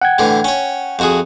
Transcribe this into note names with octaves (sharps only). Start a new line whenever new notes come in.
F#5 G5 G#6
A2 D3 E3
C#4 C#5
F2 F#4 G#4